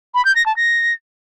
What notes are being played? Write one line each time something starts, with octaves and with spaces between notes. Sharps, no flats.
B5
G6
A#6
A5
A#6